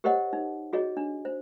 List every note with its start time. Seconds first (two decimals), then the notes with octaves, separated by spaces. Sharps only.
0.04 G4 A#4 C5 C#5 D#5 F#5
0.33 D#4
0.73 F#4 G#4 C#5 D#5
0.97 D4
1.25 C5